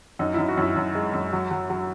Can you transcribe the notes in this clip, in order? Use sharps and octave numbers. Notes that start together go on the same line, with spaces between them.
F#2 D#4
F#2 E4
F#4
F#2 E4
F#2
G#3
F#2
F#3
F#3
F#3